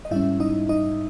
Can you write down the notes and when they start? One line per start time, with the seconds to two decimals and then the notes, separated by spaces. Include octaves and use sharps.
0.05 D#5
0.11 G#2 G3 C#4 E4 E5
0.40 D#4 D#5
0.69 D#4 D#5